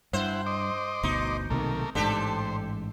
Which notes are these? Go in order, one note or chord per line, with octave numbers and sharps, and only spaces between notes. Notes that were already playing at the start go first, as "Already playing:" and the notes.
G2 E4 C5 F#5
D#5 C6 D6
G1 D2 B2 D#4
B1 C3 D#3 A3 A#3 A#4
A1 G#2 D4 G4 A4 C5